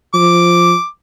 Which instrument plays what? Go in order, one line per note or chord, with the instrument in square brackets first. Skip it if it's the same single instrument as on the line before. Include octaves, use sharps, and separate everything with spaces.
[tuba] F3 [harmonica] D6